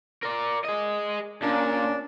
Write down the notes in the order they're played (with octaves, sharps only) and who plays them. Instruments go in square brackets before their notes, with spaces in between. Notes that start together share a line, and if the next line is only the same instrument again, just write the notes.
[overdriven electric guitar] A#4 D5
G#4 D#5
[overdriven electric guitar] A#2 [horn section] A#3 C#4 D4